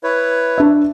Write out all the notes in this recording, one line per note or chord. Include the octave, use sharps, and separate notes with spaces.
E4 B4 C#5
D4 E5